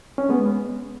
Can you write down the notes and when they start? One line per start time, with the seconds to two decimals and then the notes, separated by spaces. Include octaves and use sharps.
0.18 C#4
0.29 G#3 B3